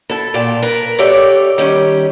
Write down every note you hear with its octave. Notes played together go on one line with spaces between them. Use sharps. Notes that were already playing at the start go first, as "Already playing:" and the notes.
E4 A4
A#2 F4 G5 A5
A#4 B4
G4 A4 C#5 D5 E5 G5
D#3 G3 C#4 G4